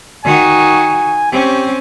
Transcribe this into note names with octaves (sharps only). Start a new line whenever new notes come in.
D#3 F#4 G#5
C4 C#4 G4